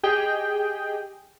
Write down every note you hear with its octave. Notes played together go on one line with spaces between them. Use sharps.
G4 G#4 D#5 G5